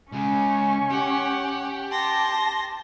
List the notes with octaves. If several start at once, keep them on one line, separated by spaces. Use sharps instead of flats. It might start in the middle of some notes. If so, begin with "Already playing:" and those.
C#2 C#3 C#4 C#6
G4 F#5
A5 C6 A#6